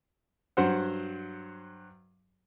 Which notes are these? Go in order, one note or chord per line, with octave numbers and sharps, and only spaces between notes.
G2 F#3 C5 F#5